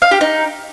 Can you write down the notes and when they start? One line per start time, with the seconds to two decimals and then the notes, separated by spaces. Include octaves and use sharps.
0.02 F5
0.11 G4
0.21 D#4